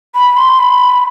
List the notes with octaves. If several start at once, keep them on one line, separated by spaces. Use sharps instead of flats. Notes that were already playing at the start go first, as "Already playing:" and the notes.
B5
C6
B5